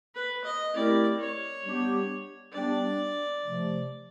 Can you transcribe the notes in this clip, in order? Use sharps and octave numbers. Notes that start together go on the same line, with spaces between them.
B4
D#5
A3 C4 E4 G4 A#4 D5
C#5
G3 B3 D4 G4
G3 B3 D4 G4 D5
C3 F3 A3